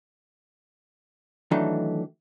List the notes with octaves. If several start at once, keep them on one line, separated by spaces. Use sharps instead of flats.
D#3 E3 F#3 A3 D4 D#4